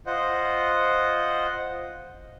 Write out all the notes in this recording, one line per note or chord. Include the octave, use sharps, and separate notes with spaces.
F4 C5 D#5 F#5